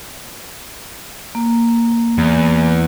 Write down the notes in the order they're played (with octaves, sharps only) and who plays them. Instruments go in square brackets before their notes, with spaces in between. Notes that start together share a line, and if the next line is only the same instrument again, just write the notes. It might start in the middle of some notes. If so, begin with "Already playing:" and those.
[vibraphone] A#3
[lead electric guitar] E2